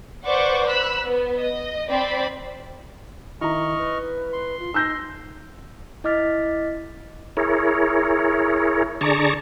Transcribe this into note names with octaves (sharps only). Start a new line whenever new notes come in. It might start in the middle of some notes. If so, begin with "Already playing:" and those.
B4 C5 D5 F#5 C#6 D6
B5 E6 F#6
B3
D#5
C4 D5 B5
D#3 E4 D#5 A#5 C#6 F6
B4
C6
F4
D#4 E6 G6 A#6
E4 D#5 D6 F6 A6 B6
E4 G#4 A#4 C#5
D3 G#4 D5 A5 A#5 C#6